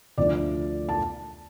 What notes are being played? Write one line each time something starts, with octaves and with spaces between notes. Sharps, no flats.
D2 D3 F3 A3 D4 D5
A5